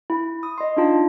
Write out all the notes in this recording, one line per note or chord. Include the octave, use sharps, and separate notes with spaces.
E4
D#6
D#5 C6
D4 D#4 F4 A5